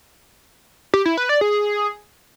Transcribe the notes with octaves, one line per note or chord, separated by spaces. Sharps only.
G4
E4
B4
D5
G#4